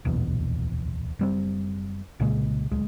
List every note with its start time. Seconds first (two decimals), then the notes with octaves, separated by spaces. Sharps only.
0.05 D1 A#1 E2 B2
1.19 F#1 G3 C4
2.20 C2 A#2 C#3 G#3
2.71 D1 C#2 G#3